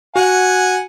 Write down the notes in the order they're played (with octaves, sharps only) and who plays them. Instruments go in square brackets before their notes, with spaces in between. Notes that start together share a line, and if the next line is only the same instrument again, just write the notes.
[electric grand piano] F#4 [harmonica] F#5 G#5